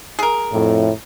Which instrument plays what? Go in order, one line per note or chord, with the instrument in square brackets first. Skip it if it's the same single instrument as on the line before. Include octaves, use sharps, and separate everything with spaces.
[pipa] G#4 A#4
[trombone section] F2 A2